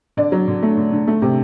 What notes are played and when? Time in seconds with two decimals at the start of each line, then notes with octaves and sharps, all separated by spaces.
0.17 D3 D5
0.32 F#3
0.48 D3
0.63 A3
0.77 D3
0.92 D3
1.07 A3
1.22 C3